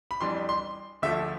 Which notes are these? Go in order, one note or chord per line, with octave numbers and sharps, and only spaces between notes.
B5
F2 E3 G3 D4 C6
C6
D2 D3 F3 A3 E5